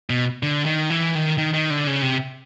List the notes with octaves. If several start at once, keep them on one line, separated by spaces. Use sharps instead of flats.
B2
D3
D#3
E3
D#3
D#3
D#3
D3
C#3
C3